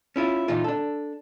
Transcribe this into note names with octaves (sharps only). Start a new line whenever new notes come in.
C#4 E4 F4
A#2 E3 D#4 F4
D4 A4